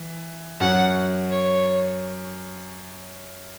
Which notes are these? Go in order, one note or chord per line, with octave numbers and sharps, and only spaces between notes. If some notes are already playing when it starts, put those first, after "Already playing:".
Already playing: E3
F#2 F#3 C#4 F#5
C#5